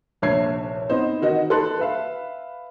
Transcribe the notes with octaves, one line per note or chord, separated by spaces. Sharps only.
F1 A#1 C#5 E5 G#6 C7
B3 C4 D#4 C5
D#3 D#4 F#4 D#5
A4 B4 C6 F#6
B4 E5 F5